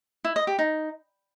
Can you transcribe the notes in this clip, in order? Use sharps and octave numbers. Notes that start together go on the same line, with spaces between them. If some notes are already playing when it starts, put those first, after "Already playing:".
E4
D#5
G4
D#4